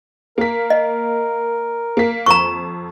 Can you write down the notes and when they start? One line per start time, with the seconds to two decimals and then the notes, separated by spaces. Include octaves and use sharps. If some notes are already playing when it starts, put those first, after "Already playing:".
0.38 A#3 A#4 B6
0.70 D#5
1.97 A#3 B6
2.26 F2 A#5 C#6